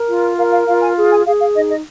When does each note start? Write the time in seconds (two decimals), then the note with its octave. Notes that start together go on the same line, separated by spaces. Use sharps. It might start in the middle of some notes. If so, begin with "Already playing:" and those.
Already playing: A#4
0.08 F4
0.38 A#4 F5
0.53 F5
0.67 F4 F5
0.82 G#5
0.96 G#4
1.11 G#5
1.26 G#4 F5
1.40 F5
1.55 D#4 D#5
1.70 D#5